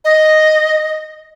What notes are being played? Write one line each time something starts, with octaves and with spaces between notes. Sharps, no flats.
D#5